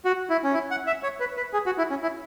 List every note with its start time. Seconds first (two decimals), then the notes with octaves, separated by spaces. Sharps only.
0.05 F#4
0.30 E4
0.43 C#4
0.54 E4
0.71 F#5
0.87 E5
1.03 C#5
1.20 B4
1.37 B4
1.53 G#4
1.66 F#4
1.78 E4
1.90 C#4
2.02 E4